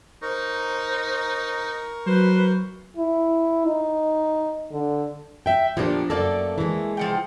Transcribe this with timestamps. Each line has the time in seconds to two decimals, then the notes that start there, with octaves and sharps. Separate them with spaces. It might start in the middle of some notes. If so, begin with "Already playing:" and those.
0.22 D#4 A#4 C5 C#6
2.07 F#3 B4 C5
2.97 E4
3.66 D#4
4.72 D3
5.46 E5 G5
5.77 A#2 F3 B3 D4 G4
6.10 F#2 A3 A#3 A4 D5
6.58 E3 G#3
6.97 F3 F#5 G5